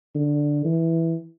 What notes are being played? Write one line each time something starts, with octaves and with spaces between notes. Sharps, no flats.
D3
E3